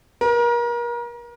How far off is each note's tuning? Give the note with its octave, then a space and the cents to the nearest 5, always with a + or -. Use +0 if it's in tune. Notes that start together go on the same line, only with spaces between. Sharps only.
A#4 +35